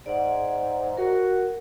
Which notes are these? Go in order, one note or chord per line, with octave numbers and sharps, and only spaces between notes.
G#2 D5 F#5
F#4 A#4